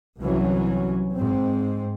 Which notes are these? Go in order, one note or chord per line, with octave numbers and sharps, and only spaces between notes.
C2 E3 F#3 C#4
G#2 C4